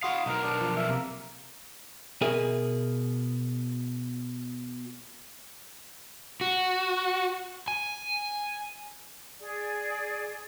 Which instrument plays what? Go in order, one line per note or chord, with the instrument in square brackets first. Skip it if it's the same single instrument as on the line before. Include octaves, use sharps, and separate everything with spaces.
[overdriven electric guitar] E4 F5 [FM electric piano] F#4 C6 D#6
[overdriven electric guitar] B1 A#4 [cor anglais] D#4
[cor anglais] D4
[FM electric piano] F3
[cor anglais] E5
[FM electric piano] C3 [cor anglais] A#3
[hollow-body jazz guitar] B2 G#4 A#4 E5 G#5
[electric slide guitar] F#4
G#5
[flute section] G#4 D5